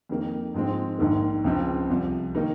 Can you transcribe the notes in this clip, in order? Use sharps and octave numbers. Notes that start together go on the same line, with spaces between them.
F2 D#3 A#3
G#2 F3 G#3 C4
A#1 G#2 D#3 A#3
C#2 C#3 F3 C4 F4
C2 C3 F3
D#3 A#3 D#4